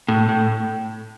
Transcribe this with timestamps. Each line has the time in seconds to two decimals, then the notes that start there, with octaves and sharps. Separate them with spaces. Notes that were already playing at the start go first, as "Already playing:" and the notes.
0.08 A2
0.29 A2